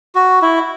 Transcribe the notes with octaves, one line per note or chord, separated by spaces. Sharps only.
F#4
E4